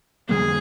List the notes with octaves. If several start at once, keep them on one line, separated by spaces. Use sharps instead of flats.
F2 D3 G3 A#3 G#4